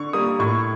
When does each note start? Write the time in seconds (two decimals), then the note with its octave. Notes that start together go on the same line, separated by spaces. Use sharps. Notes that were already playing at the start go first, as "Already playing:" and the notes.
Already playing: D3 C#6
0.13 G3 A#3 D#6
0.40 A2 C#6